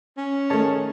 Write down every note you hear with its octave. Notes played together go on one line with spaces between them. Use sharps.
C#4
D#3 A3 G#4 C#5 A5